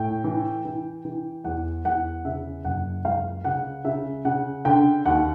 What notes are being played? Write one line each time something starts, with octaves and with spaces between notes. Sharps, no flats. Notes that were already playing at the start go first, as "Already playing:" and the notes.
Already playing: A2 G5
E3
E3
E3
E2 F#5
E2 F#5
C#3 E5
F#1 F#5
C#2 F5
C#3 F#5
C#3 E5
C#3 F#5
D3 G5
D#2 F#5